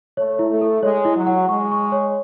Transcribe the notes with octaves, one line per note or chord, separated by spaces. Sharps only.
A3 C#5
E4
A3
A4
G#3 C#5
E4
F#3
F#5
G#3 C#6
C#6
C#5